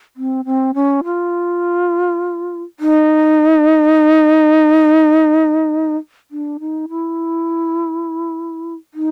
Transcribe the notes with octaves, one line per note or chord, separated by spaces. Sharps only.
C4
C4
C#4
F4
D#4
D4
D#4
E4
D#4